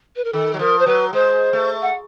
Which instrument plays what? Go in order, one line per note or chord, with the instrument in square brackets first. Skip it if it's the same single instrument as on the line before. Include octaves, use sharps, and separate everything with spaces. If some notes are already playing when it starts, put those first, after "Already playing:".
[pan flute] B4
A#4
[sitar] D#3 [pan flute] A4
[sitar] F#3
[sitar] F3 [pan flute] A#4
[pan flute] C5
[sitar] F#3 [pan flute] B4
[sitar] G#3 [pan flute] C5
[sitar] A3
[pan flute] F#5